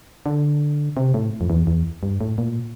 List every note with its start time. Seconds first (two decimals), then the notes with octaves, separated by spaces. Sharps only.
0.26 D3
0.97 C3
1.14 A2
1.41 F2
1.50 E2
1.67 E2
2.03 G2
2.21 A2
2.38 A#2